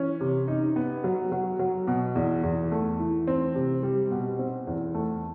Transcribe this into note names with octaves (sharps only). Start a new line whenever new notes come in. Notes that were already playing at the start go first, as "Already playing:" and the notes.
Already playing: E3 C#4
C3
D#4
B3
F#3
F#3
F#3
B2
E2
E2
A3
E3
C4
C3
G3
B2
C4
E2
A3